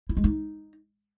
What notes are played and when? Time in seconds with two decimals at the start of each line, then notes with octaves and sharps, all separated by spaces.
0.09 E4
0.17 G#3
0.24 D#4